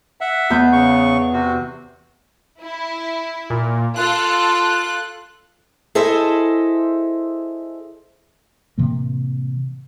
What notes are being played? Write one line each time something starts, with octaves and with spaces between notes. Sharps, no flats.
E5 F#5
E2 B3 G6
C#3 C#6
C3 F#4
E4
A#2
F4 A4 F#6
E4 G#4 A4 C5 D#5 E5
A2 C3 E3 A#3